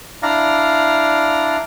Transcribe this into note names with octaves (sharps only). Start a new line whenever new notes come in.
D4 E4 D5 F5 A#5